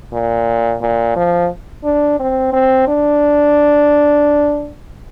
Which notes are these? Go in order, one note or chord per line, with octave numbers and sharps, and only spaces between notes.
A#2
A#2
F3
D4
C4
C4
D4